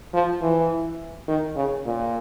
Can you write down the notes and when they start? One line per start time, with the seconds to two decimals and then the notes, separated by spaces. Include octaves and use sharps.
0.14 F3
0.42 E3
1.28 D#3
1.56 C#3
1.86 A#2